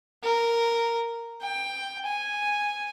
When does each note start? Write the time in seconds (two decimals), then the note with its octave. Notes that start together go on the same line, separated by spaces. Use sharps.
0.23 A#4
1.42 G5
2.06 G#5